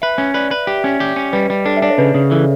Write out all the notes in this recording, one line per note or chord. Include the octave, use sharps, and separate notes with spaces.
B4 E5
C#4
B4 D5
B4
G4
C#4
G4
C#4
G3 B4
G3
D4 A4
E5
D4 D5
C#5
C#3 B4
C#3
E3 A4